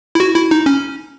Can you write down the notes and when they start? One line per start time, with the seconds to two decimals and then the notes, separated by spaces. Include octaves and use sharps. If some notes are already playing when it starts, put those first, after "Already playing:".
0.15 E4
0.20 F#4
0.35 E4
0.51 D#4
0.66 C#4